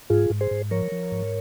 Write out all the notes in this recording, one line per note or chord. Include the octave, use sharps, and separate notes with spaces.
G#2 F4 G#4
G#2
G#4 C5
G#2
F3 A#4 C#5
F3
G#2